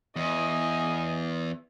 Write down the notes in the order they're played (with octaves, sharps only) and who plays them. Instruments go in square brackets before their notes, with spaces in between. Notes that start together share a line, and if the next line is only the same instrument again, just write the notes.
[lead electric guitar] E2 [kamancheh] D#5 G#5